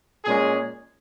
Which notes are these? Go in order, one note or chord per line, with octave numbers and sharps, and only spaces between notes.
A#2 G#3 C#4 G#4